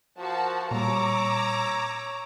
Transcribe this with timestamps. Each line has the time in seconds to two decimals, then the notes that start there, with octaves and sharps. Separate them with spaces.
0.18 F3 F#4 A#4 A5
0.71 A#2 G3 C#5 A#5 D6 E6